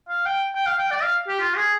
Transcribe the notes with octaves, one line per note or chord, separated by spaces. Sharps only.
F5
G5
G5
F5
G5
D5
F5
G4
F4
G#4